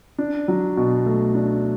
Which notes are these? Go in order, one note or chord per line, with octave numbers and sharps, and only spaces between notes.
D4
F#3
B2
A3
D4